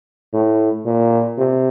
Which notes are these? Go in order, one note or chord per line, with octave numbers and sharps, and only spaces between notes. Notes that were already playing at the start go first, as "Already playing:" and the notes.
A2
A#2
C3